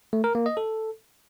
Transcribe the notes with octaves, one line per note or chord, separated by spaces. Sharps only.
A3
A#4
A#3
D#5
A4